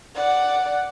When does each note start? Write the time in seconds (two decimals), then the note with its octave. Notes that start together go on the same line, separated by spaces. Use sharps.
0.15 D5 F#5